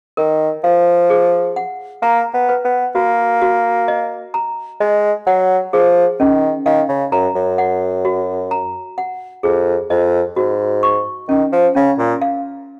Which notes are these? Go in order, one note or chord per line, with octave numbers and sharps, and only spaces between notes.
D#3 A#4
F3 F5
G#4
F#5
A#3 A#5
B3
B4
B3
A#3 F#4
F#4
D#5
A#5
G#3 D#5
F#3 F#5
F3 G#4
D#3 C#4
D#3 F5
C#3
F#2 A#5
F#2
F#5
F#4
A#5
F#5
F2 G#4
F2 D#5
G#2 F#4
C#6
D#3 C#4
F3
C#3 C#4
A#2
F5